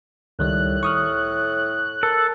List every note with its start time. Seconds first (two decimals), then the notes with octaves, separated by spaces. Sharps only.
0.39 C#2 A2 D#3 G3 F#6
0.83 C#6 D#6 F6
2.03 A4 A#4